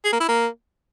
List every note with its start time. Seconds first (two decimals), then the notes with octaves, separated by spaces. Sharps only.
0.05 G#4
0.13 A#3
0.20 E4
0.28 A#3